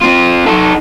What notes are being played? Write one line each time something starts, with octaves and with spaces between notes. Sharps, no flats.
C4 F4
D#4 A4